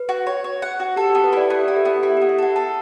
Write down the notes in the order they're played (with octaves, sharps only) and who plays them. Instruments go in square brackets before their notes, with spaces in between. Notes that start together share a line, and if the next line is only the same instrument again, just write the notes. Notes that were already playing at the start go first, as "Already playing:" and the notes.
Already playing: [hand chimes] B4
[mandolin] F#4
C#5
C#5
F#5
F#4
[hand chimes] G4 [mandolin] A4
[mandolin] B3 [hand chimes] G4
[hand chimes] B4
[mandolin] E4 [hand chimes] D5
[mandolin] B3 [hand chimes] G4
[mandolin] E4 [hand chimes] G4
[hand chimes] A4
[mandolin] B3
[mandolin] E4 [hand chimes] G4
[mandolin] B3 [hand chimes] G4
[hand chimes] E5
[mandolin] A4 [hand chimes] F#5
[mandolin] A4 [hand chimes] A5